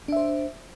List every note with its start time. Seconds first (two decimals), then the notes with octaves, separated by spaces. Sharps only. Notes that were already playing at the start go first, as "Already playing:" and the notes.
0.08 D4
0.12 E5
0.16 C5